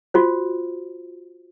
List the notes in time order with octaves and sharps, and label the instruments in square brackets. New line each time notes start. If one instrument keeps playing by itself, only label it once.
[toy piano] F4 F#4 C5